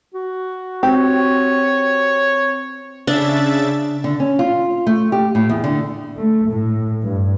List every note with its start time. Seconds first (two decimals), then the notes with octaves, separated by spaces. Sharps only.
0.14 F#4
0.83 C4 G4 C#5
3.07 C#3 D4 E5 A6
4.04 D3
4.20 C#4
4.39 F4
4.87 A3
5.12 G4
5.35 A2
5.49 E2
5.64 D3
6.17 A3
6.47 A2
7.02 G2